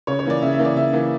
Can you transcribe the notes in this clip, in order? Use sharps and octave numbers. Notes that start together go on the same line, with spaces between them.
C#3 C#5
C#5
E3 A#3 D5
C#3 E5
E5
E3 A#3
D5
C#3 E5
E3 A#3